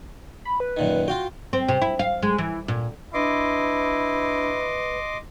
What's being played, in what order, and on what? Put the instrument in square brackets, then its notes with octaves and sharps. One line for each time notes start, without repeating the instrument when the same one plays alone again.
[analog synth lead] B5
B4
[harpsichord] F#2 A#2 D#3
[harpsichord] F4 F5 G5 [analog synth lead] F#4
[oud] C4
C3
E4
F5
G#3
E3
A#2
[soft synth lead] D4 [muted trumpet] E4 [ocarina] B4 [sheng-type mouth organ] D#5 C6 D6